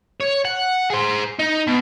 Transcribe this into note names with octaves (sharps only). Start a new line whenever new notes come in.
C#5
F#5
G#4 C5
D#4
B2